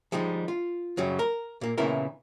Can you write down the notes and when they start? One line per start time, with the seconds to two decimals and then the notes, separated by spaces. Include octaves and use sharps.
0.12 F3 G3 G#3 D#4
0.48 F4
0.97 F#2 C#3 F#3 G3
1.19 A#4
1.61 A#2 A#3
1.78 A#2 C#3 E3 B3 E4 A#4